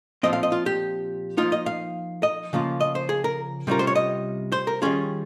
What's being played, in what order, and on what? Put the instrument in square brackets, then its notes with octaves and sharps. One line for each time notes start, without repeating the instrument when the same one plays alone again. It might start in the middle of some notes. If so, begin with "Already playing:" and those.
[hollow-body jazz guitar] A#2 F3 C4 D#5
F5
D#5
F4
G4
F3 A#3 D#4 F4
D#5
F5
D#5
C#3 F3 A#3 F4
D#5
C5
G#4
A#4
C3 G3 C#4 F4 A#4
C5
C#5
D#5
C5
A#4
D#3 G3 C#4 F4 G#4